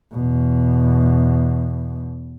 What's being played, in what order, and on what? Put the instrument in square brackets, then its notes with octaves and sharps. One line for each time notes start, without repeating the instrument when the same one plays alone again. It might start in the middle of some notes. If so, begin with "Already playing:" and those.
[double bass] E2 B2